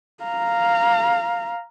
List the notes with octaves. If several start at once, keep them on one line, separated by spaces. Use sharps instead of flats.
F5 A#5